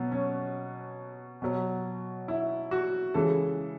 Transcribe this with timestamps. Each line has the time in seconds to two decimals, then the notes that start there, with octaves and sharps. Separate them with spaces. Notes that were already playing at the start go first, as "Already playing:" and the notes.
Already playing: B2 F#3 B3
0.12 C#4
1.42 B2 F#3
2.28 E4
2.71 F#4
3.14 C#3 E3 G#3 A4